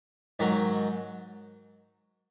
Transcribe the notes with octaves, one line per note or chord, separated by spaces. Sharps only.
G#2 D#3 F#3